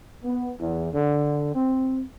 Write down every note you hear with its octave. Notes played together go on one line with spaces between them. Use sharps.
B3
E2
D3
C4